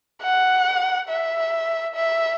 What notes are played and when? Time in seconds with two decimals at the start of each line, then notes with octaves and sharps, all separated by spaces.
0.22 F#5
1.09 E5
1.95 E5